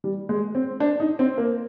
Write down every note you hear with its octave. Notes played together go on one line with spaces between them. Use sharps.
G3
G#3
C4
D4
D#4
C4
A#3